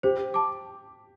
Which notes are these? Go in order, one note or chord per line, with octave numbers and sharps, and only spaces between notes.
G4 C5
A5 D6